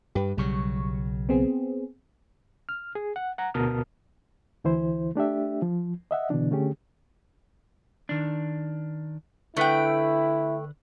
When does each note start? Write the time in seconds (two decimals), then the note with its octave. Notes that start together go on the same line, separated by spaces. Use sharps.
0.15 G2 G4 B4
0.37 B1 C#3 F#3 G3 C#6
1.29 B3 C4 G#4
2.69 F6
2.95 G#4
3.16 F#5
3.38 F#5 A#5
3.54 D2 B2 A#4 A5 D#6 F6
4.64 D2 E3 E4 C5
5.15 A3 D4 G4 E5
5.62 F3
6.11 D#5 E5 F#5
6.30 B2 D3 E3 D4
6.51 D3 A3 C#4 G4 G#4
8.09 D#3 D4
9.57 D3 A3 E4 B4 F#5 G5